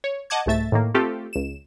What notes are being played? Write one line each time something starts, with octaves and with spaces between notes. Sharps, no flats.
C#5
D#5 F#5 A5 D6 G#6
C2 G#2 A3 E5 A6
A2 D#3 A#3
A3 C4 F4 G4 A4
C#2 E7